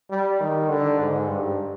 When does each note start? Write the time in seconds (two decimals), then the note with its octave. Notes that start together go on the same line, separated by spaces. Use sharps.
0.10 G3
0.40 D#3
0.69 D3
0.99 G#2
1.28 G2